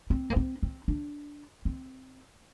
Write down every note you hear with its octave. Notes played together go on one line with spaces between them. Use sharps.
C4
A#3
C4
C4
D4
C4